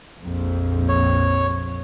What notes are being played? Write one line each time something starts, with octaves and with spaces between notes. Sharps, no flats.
A#1 F2
C#5